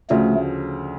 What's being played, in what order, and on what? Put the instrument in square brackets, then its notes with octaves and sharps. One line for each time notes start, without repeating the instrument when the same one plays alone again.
[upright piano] D2 C#3 F3 [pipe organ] A3